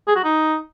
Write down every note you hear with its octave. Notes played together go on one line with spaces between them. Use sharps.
G#4
F#4
D#4